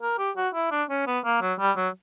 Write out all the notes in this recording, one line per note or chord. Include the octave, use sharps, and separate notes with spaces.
A#4
G4
F#4
E4
D4
C#4
B3
A#3
F#3
G3
F#3